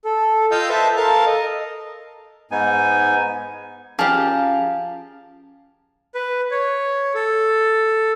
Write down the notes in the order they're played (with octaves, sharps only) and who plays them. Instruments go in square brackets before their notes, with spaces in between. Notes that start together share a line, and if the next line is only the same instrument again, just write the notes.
[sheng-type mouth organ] A4
F4 D#5 F5 G5 E6 G6
A4 B4 C5 E5 A5
A4 A#4 F5 A5
D#5
[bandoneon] G#2 B3 D#4 G#5
[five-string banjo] F3 G4 [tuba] C#4 [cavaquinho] G#4 A#4 [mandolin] F5 A5
[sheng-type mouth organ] B4
C#5
A4